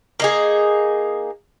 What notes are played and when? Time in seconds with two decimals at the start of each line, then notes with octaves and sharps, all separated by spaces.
0.20 A#3 D#4 G#4